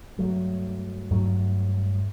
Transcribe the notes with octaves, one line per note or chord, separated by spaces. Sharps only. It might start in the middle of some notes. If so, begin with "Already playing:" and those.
G2 F#3 A3
G2 F#3 A3